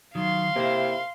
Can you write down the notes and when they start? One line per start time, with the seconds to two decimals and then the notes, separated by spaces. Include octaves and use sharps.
0.15 D#3 F#3 F5 C6
0.56 C3 A#3 E4